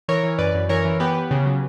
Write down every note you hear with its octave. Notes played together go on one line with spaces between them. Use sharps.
E3 A#4 C#5
E3
F#2 B4 D5
F#2
E3 A#4 C#5
E3
B3 G4 B4
B3
C#3
F#3